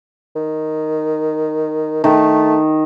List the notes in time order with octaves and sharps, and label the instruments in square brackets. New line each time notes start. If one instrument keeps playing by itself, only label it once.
[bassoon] D#3
[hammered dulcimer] D#3 [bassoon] A3